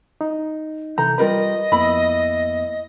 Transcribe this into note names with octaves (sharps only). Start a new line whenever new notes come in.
D#4
C3 E3 A4 A#5 G6
G3 F4 G4 A#4 B4 D#5 B5
F2 A#3 B3 E4 B5